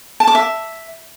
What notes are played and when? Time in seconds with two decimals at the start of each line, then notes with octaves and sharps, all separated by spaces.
0.20 A5
0.27 D6
0.35 E5